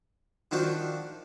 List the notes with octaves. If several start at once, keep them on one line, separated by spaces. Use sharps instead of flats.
D#3 F3 D4 F#4